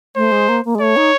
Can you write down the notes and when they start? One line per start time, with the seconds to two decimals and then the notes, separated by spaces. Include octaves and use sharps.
0.16 A3 C5
0.32 G#3
0.48 A#3
0.65 A#3
0.75 G#3
0.80 A3 C#5
0.96 D#4